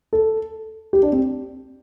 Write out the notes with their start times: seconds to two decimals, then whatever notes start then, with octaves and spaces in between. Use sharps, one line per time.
0.13 A4
0.93 G4
1.03 D4
1.12 C4